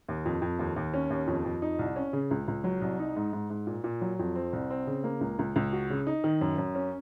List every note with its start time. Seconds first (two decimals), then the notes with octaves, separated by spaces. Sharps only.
0.08 D#2
0.25 F2
0.42 F2
0.59 D#2
0.76 D#2
0.94 C#4
1.10 D#2
1.27 F2
1.45 F2
1.62 D#4
1.79 C2
1.96 C#4
2.13 C#3
2.31 C#2
2.48 C#2
2.64 F#3
2.81 C2
2.99 D#4
3.16 G#2
3.33 G#2
3.50 G#2
3.67 A#2
3.84 A#2
4.01 F#3
4.19 F2
4.35 C4
4.53 C2
4.70 C4
4.87 C#3
5.04 A#3
5.21 C#2
5.39 C#2
5.56 C#2
5.72 F#4
5.90 C#3
6.07 D#4
6.24 D#3
6.41 F#2
6.58 F#2
6.75 C#4